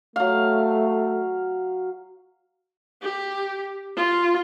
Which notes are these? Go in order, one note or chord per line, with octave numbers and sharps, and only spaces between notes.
F#3 A3 F5
G4
F4